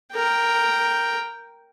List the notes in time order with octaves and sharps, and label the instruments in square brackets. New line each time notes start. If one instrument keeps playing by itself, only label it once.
[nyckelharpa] A#4 G5